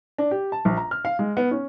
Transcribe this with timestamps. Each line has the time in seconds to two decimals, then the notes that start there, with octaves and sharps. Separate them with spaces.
0.18 D4
0.31 G4
0.52 A5
0.65 A#1
0.77 A#5
0.91 F6
1.05 F5
1.19 G#3
1.37 B3
1.51 C#4